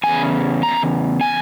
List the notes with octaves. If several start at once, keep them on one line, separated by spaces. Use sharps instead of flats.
E2 C#3 G#5
A#5
G#5